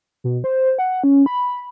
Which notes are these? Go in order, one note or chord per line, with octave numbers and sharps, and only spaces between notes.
B2
C5
F#5
C#4
B5